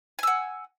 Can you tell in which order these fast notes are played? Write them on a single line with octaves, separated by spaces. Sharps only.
G#5 E6 F#5